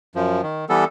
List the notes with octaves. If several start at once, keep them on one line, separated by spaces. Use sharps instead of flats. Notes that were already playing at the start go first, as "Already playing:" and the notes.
F#2 F3
D#3
E3 G3 B3 A4